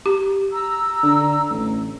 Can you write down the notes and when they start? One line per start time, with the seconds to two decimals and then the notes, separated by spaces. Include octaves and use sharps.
0.06 G4
0.52 A#5 E6
1.03 D3
1.50 A1